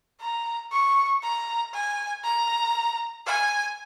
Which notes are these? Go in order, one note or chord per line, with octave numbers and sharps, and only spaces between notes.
A#5
C#6
A#5
G#5
A#5
G#5